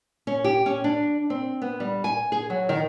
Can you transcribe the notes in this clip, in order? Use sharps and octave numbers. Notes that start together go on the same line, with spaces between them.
C#4
G4
C#4
D4
C4
B3
G3
G#5
G#4
F#3
D#3